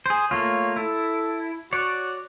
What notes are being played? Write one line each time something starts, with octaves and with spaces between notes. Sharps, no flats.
G#4 C5
A3 A#3 F4 C#5
E4 A4
F#4 C#5 D5